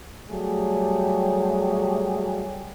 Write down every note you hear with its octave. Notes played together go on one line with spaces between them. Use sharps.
F#3 G3 A3 G4 G#4